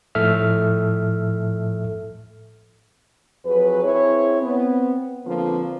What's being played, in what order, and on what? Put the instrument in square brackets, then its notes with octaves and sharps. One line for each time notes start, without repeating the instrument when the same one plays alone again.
[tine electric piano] A2 F3 A4 E5 F6
[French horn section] F2 F#3 G#4 B4
C4 E4 G#4 C#5
B3 C4
D3 F3 A#3 C4 F4 B4